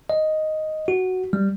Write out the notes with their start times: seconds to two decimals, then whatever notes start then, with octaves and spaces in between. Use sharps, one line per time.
0.10 D#5
0.88 F#4
1.33 G3